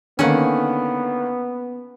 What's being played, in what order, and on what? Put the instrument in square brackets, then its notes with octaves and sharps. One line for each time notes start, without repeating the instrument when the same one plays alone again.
[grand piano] D3 D#3 A#3 [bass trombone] B3 [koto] C#4 F#5